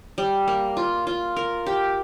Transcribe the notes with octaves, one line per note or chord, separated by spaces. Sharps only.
G3
A#3
F4
F4
A#4
G4